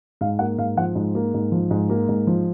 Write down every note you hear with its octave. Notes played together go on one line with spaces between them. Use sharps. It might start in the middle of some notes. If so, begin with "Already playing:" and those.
G#2 F5
A#3 F#5
G#2 F5
F3 F#5
G#2
A#3
G#2
F3
G#2
A#3
G#2
F3